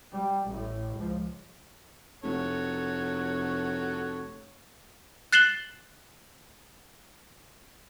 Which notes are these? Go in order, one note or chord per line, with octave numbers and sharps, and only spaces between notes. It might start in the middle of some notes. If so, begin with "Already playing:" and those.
G3
A1 A2
C#2 F3
F1 F#4 A4 C#5
F#6 A6 C7 E7 F#7 G7